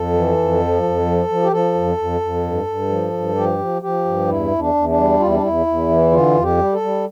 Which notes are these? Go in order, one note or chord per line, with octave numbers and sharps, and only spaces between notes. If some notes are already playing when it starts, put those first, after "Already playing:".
Already playing: F2 A4
E3
F2
F3
F2
F3
F3
G4
F3 A4
F2
F2
F2
G2
G2
F3
G2
F3 G4
F3
F3 G4
G2
E2 E4
E2
D4
E2
D4
G3
E2 F4
E4
D4
E2 E4
E2
E3
D3 F4
F2
G4
G3
A4
G3